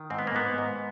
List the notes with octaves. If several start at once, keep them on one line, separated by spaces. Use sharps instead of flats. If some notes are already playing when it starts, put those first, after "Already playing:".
Already playing: D#3
G#2 C4
B3
A#3
G#2 B3
G#2